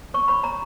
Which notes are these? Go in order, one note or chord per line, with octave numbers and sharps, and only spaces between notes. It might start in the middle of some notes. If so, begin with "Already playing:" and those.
C#5 C#6
C#5 B5
C#5 A#5